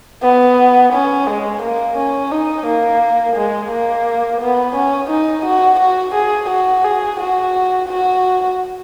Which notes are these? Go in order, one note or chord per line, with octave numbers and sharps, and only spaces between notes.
B3
C#4
G#3
A#3
C#4
D#4
A#3
G#3
A#3
B3
C#4
D#4
F#4
F#4
G#4
F#4
G#4
F#4
F#4